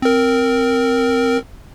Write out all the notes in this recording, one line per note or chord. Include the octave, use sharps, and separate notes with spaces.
C4 A#4